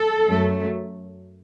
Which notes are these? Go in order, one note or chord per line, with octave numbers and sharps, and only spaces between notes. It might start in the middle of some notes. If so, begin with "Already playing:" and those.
Already playing: A4
F#2 F#3 A3